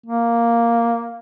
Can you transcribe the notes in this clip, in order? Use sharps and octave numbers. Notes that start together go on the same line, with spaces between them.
A#3